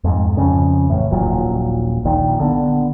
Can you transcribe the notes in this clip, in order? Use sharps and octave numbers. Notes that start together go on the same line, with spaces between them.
F2 G#2
F2 C#3
A1 A2
D#1 A#1 A#2 F#3
A#1 A#2 D#3
D3 B3